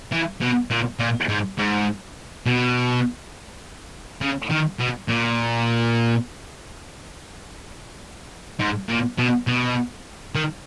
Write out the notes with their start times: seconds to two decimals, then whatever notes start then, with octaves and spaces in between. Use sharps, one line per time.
0.12 E3
0.41 B2
0.71 A#2
0.99 A#2
1.29 G#2
1.58 G#2
2.46 B2
4.22 C#3
4.51 D#3
4.80 B2
5.09 A#2
8.59 G#2
8.89 A#2
9.18 B2
9.47 B2
10.35 D#3